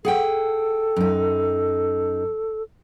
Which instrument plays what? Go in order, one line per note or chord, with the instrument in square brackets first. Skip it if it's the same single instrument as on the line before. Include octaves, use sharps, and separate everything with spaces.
[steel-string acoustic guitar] G#4 F#5 G5 [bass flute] A4
[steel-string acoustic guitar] F#2 D#4